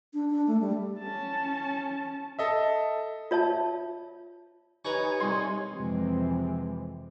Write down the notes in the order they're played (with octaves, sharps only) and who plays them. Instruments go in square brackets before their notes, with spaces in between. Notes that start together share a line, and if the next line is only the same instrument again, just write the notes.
[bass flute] D4
D4
A3
G3
[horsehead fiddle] C#4 A5
[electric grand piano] A4 D#5 E5
[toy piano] F4 C#5 E5 A5
[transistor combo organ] D#4 C#5 G#5 [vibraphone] G4 D#5 [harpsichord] B4 A#5 C#6
[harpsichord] C2 [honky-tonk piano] C6
[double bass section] F2 C3 E3 G#3 C4